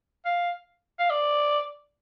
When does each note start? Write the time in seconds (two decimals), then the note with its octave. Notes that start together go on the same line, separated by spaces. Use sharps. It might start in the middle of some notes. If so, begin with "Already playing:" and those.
0.25 F5
0.99 F5
1.10 D5